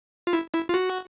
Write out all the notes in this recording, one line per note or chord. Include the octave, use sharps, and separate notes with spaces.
F4
E4
E4
F4
F#4